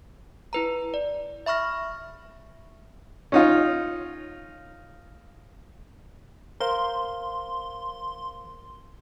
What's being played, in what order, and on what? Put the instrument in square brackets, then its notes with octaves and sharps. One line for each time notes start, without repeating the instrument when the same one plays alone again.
[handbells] E4 B4 A#5
D5
E5 B5 C#6 F6 A#6
[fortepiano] C#4 D#4 F4
[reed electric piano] A#4 C5 F5 [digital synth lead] C6